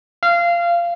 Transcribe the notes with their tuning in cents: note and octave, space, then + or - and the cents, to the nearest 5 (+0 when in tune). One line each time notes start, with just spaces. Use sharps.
F5 -20